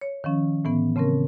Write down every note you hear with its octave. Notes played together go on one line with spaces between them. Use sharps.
C#5
D#3 F3 C#4
A2 E3 B3
C#3 A3 C4 C#4 A#4